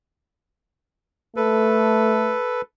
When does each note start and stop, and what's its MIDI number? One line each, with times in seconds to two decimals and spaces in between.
1.36 2.35 57
1.36 2.62 69
1.36 2.62 71